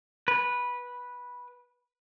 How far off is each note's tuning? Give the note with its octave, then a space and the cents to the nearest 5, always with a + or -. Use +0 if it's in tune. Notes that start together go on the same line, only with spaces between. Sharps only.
B4 -10